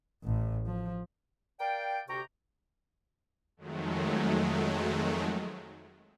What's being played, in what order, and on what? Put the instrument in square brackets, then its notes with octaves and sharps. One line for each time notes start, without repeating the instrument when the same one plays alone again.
[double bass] A1 A2
F3
[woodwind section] A#4 D5 F5 G5
D2 C3 G4 G5 A#5 C#6
[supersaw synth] F2 D#3 F#3 G#3 A3